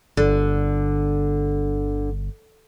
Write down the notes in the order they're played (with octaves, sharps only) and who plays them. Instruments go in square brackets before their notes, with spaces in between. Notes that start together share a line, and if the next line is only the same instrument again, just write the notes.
[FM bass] G1 [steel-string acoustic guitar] D3